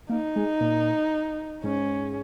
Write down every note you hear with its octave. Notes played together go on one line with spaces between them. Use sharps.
A#3 D#4
G#3
A#2
G#2 C#4